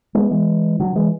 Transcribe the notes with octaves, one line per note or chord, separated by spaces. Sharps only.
G#3 B3
E3 G#3
D3 F#3
E3 G#3